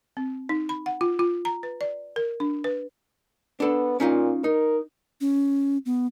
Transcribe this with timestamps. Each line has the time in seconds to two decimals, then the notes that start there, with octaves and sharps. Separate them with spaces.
0.17 C4
0.49 D#4
0.69 B5
0.86 F#5
1.01 F4
1.19 F4
1.45 A#5
1.63 B4
1.81 D5
2.16 A#4
2.40 D4
2.64 B4
3.60 B3 D4 A4
4.00 A#2 C#4 D#4 F4
4.44 D#4 A#4
5.21 C#4
5.86 B3